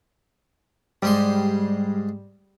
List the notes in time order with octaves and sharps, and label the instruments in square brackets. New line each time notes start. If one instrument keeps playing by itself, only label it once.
[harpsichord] G#2 G#3 C6 [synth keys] G3